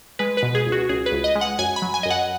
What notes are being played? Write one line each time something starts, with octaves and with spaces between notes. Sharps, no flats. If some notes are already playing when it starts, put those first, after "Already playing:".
G#3 B4
B4
B2
G#4
C#2
F#4
C#2 G#4
B4
C#2
D#5
G#3
F#5
F#2 G#5
B5
F#3
G#5
F#2 D#5
F#5